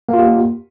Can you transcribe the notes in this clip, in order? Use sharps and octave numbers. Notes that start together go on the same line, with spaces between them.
A#3 F4 G4